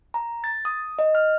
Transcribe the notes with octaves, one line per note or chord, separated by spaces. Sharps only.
A#5
A6
D#6
D#5
F6